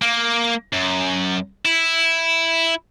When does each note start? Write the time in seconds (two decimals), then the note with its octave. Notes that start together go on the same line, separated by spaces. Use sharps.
0.02 A#3
0.73 F#2
1.65 E4